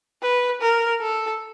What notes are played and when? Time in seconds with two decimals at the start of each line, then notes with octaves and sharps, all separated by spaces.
0.22 B4
0.61 A#4
1.01 A4